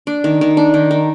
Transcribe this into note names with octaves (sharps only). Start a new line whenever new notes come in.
D4
D#3
D#3
D4
D#3
D#3